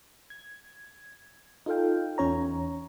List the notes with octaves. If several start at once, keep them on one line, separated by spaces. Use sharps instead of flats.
G#6
D#4 F4 A4 F5 G5
E2 C#4 C#5 A#5